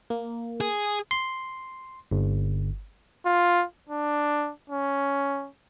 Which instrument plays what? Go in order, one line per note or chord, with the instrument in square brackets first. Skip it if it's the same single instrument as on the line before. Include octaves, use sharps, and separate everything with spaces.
[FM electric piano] A#3
[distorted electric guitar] G#4
[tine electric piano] C6
G1
[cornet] F4
D4
C#4